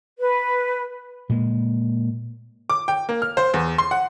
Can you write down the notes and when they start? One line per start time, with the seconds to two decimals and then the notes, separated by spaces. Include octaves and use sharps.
0.19 B4
1.29 A#2 G#3
2.70 D6
2.88 G5
3.09 A#3
3.22 F6
3.37 C5
3.54 E2
3.78 C6
3.91 F#5